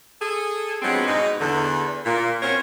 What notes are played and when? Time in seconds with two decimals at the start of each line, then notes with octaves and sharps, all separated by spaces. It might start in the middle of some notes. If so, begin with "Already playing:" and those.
0.20 G#4 A4
0.81 G2 F3 F#3 G#3 B3 C4
1.06 G#2 B2 G#3 D#4
1.40 E2 D3
2.04 A#2
2.41 C4 C#4 F#4 A#4 C5 C#5